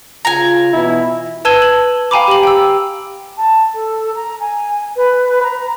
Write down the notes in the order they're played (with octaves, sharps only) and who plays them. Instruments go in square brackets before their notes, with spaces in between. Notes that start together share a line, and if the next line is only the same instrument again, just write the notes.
[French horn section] C#3 F4 [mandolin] G#5 A#5
[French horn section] B2 E3 [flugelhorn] E4
[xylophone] B4 A5 E6 G#6 D#7 G7
F#7
F5 G5 G#5 A#5 B5 D6
G4 F#7
G5 E6
[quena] A5
A4
A#5
G#5
B4
A#5